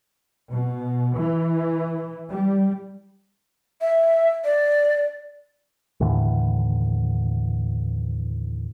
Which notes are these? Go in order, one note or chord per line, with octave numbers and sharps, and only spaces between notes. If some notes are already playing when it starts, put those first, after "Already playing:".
B2
E3
G3
E5
D5
D#2 A2 D3 E3